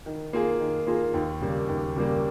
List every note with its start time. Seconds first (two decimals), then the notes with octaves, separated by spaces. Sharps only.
0.06 D#3
0.33 A#3 F4 G#4
0.60 D#3
0.87 A#3 F4 G#4
1.14 D#2
1.41 C#3 G3 A#3
1.68 D#2
1.96 C#3 G3 A#3